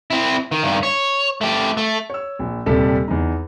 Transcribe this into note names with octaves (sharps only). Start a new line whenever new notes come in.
C4 E4
D#3
G2 D#3
C#5
A3 G4
A3
C#5 E6
A#1
D#1 C3 G3 A4
E2 D#4